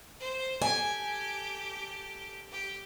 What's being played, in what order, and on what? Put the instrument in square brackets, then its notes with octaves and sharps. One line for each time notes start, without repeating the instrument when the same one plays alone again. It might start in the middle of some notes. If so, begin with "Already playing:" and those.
[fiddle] C5
[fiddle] G4 A4 [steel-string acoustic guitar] G#5
[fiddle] G4